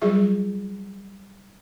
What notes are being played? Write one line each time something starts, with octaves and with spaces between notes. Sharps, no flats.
F#3 G3 F4 G#4 E5